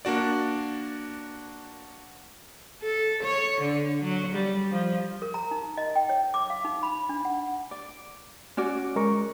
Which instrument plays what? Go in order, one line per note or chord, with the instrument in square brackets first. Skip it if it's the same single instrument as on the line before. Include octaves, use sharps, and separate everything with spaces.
[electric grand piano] A#3 D4 F#4 D5
[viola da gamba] A4
C#5
D3
F#3
G3
F3
[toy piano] A#4
A#5
D#4
D#5
G5
C#5
D6
F5
D#4
B5
D4
F#5
[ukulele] D5
C#4 F#4 D5
[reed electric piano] G#3 A#4 C#6